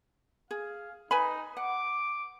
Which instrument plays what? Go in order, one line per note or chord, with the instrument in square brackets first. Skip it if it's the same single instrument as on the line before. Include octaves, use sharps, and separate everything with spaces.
[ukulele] G#4 [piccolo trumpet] F5
[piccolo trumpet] D#4 [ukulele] B4 G#5 B5
[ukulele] F#5 [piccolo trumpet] D6